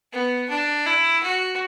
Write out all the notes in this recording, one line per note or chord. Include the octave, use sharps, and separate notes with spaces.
B3
D4
E4
F#4